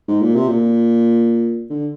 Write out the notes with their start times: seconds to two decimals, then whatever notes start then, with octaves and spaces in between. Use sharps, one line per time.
0.08 G#2
0.22 A#2
0.35 C3
0.48 A#2
1.70 D3